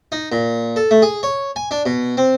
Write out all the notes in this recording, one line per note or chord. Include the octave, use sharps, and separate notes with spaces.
D#4
A#2
A4
A3
G#4
C#5
G#5
D4
B2
C4